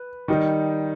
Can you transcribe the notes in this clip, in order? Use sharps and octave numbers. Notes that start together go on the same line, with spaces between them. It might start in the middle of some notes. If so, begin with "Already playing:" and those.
Already playing: B4
D#3 G3 D#4